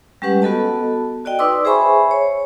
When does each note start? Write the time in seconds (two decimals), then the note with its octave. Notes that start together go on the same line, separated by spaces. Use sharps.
0.22 G3 G#3 C#4 G4 B4 F#5
0.42 B3 F#4 A4 D#5 A5
1.25 F#4 D5 D#5 G5
1.39 D#4 B4 D5 C6 D6 E6
1.65 G#4 C5 E5 G#5 B5 C#6
2.11 C#5